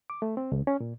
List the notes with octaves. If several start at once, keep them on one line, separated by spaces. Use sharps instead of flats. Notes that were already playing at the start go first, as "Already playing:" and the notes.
D6
A3
C4
C#2
C#4
A#2